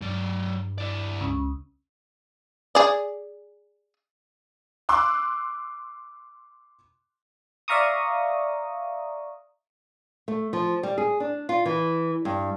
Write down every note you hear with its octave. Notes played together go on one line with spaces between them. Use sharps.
G2 F#3 D5
E4 D5
C#2
G#4 D5
C6 D6 E6 F#6
D5 E5 F5 A#5 C#6 D#6
A3
F3
G3
G#4
D4
F4
E3
G2